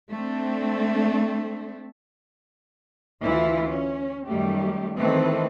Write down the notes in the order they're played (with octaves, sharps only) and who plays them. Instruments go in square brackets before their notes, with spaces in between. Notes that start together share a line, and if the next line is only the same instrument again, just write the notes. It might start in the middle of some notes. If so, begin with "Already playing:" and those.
[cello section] A3 C4 D4
D2 E3 E4 F4
C#4
F#2 D#3 G3 A3 G4
D#3 E3 A3 C4 A4 B4